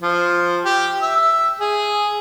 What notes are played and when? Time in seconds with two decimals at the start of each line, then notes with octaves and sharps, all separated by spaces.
0.02 F3
0.65 G4
1.02 E5
1.60 G#4